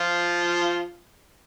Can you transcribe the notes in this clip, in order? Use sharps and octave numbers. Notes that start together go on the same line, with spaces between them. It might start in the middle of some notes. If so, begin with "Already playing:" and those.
Already playing: F3 F4